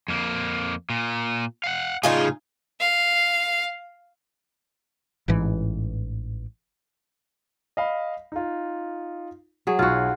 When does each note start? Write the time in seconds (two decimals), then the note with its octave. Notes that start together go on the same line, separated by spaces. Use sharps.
0.08 F2 A#3
0.90 A#2
1.64 F5 F#5
2.03 A2 C#3 D#4 F4 G#4
2.80 F5
5.28 A1 G#2 E3
7.77 D#5 F5 B5
8.32 D#4 F4
9.67 F#3 G#4
9.79 B1 F4 F#4